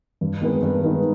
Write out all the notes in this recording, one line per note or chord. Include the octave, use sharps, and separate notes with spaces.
G2
D#3 G#3 B3 D#4
G2
D#3 G#3 B3 D#4